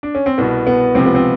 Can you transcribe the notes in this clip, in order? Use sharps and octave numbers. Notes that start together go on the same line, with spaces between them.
D4
C#4
C4
C2 B2 B3
B3
C#2 C3 F3 C4
B3
C4